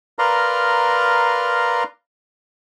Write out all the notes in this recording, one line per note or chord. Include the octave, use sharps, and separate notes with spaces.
A#4 B4 D5 F5 A#5 C6